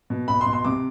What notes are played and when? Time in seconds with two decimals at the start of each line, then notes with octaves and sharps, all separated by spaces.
0.10 B2
0.28 B2 B5
0.41 C6
0.46 B2
0.53 C6
0.65 C3 D6